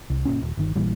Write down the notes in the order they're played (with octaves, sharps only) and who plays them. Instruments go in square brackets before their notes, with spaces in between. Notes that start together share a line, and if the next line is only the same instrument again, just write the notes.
[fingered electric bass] C2
F#1 A#2 C#4
D#1
G1 D#3
A#1 A#2 E3 G3